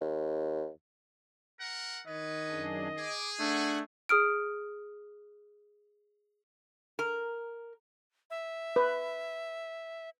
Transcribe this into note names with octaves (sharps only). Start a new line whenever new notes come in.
D#2
A#4 F#5
D#3 B4 C#5 D#5
F#2 D4 G#4
G#4 D6
A3 D4 F#5 F#6 G#6
G#4 D#6 F6 D7
A#4
E5
B4